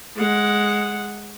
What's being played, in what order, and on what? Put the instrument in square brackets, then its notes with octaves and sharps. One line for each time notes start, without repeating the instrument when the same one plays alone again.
[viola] G#3 F#5